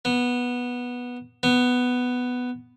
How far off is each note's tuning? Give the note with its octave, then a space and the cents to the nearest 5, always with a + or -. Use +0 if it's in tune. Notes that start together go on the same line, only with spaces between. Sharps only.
B3 -10
B3 +5